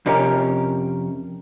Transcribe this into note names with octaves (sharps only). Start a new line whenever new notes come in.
F2 C3 C#4 G4 A#4 F5